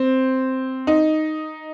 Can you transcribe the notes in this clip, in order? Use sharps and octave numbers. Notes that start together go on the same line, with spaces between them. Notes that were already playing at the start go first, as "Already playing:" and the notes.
Already playing: C4
D#4